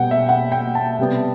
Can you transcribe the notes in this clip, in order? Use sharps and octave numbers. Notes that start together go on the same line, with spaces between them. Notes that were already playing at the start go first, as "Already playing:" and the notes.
Already playing: B2 G3 B3 F#5 G5
E5
F#5
G5
A5
C3 G3 B3